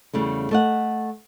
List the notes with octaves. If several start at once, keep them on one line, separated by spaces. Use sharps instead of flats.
E2 C#3 G3 A3
A3 D#5 F#5